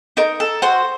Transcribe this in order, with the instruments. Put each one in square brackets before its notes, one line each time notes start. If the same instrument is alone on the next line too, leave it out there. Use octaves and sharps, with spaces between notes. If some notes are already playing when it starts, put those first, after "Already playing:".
[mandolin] D#4 A#4
A4
F#4 C5